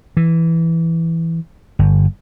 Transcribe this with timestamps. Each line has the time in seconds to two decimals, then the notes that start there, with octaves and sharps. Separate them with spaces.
0.17 E3
1.79 G1